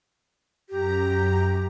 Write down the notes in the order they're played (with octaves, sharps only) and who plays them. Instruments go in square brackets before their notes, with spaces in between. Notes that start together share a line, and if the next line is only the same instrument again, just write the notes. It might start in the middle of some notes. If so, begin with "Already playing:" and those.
[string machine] F#2 A#5 [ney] G4